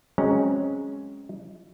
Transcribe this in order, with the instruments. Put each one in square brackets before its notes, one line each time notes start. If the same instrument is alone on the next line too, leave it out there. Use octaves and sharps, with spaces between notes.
[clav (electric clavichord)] F#3 G#3 C4 C#4 A#5